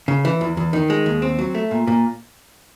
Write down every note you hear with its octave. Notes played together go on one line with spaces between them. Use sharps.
C#3
E3
E2
E2
D#3
G#3
D#2
C4
F#3
A3
A#2
A#2